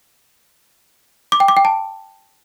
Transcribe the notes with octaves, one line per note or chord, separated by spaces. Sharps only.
D6
G5
D6
G5
A5